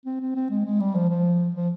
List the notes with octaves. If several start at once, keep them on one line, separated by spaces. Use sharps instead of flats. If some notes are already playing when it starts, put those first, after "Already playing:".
C4
C4
C4
G#3
G#3
G3
F3
F3
F3